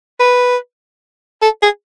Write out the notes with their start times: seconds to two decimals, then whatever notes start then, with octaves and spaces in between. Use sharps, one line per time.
0.20 B4
1.42 A4
1.62 G#4